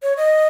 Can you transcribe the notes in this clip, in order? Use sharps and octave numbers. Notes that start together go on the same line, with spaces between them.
C#5
D#5